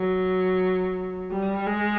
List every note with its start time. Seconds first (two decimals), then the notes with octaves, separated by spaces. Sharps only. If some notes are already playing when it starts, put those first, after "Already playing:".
Already playing: F#3
1.31 G3
1.66 G#3